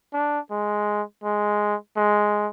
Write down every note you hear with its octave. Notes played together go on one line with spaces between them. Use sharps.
D4
G#3
G#3
G#3